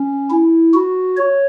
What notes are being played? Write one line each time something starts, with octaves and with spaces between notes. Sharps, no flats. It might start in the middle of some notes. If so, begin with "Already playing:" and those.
Already playing: C#4
E4
F#4
C#5